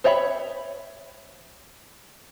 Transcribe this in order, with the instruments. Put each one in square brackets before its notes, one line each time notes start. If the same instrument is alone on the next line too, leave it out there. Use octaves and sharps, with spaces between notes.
[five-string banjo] C5 C#5 E5 F#5 B5